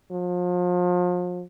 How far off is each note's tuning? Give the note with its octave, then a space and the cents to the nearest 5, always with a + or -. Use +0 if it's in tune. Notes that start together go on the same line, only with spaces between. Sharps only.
F3 +35